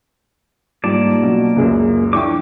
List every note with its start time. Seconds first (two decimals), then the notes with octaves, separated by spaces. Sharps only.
0.84 G#2 G3 A#3 F4 D5 A5
1.22 B2 F#3 C#4
1.56 C#2 F#2 C#3 G#4
2.13 F3 D4 E4 G5 C#6 D6